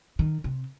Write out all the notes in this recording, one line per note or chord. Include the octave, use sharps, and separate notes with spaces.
D#3
C3